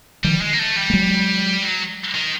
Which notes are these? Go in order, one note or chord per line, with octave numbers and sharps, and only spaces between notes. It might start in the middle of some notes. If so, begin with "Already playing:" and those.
D#3 F3 G3
G#3
A#3
A3
G3
A3
F#3 G#3
F#3
D#3